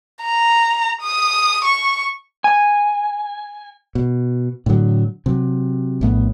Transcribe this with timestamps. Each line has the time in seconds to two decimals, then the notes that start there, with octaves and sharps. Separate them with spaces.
0.24 A#5
1.02 D#6
1.64 C#6
2.44 G#5
3.95 B2
4.66 A2 D3 F#3
5.26 C3 F#3
6.01 A#1 A2 B3